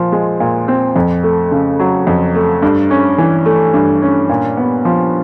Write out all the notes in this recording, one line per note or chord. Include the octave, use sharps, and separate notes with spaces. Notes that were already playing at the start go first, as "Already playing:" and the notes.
Already playing: A#2 F3
G#3
A#2
C4
F2
A3
C#3
F#3
F2
A3
G2
C#4
E3
A3
G2
C#4
A#2
B3
F3